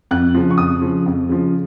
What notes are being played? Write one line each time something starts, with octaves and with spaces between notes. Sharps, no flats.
F2 F#6
C#3 F3
C#6
F2 D#6
C#3 F3
F2
C#3 F3